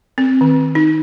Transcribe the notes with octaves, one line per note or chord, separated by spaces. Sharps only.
C4
D#3
D#4